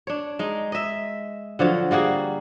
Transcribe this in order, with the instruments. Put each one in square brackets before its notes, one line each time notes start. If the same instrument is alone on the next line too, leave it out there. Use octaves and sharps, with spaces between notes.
[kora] D4 C#5
G#3 D#4
D#5 E5
D3 F3 F#3 C#5
G3 A#3 F#4 G#4